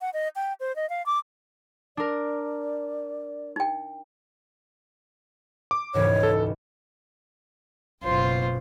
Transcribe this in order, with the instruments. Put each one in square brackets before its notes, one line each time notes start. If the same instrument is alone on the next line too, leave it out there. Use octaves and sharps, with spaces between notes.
[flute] F#5
D#5
G5
C5
D#5
F5
D6
[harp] D4 A#4 [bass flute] D5
[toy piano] D#4 G5
[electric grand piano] D6
[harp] E1 C#2 G#2 [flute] C#5
[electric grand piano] A4
[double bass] F#1 B2 [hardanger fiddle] F4 C5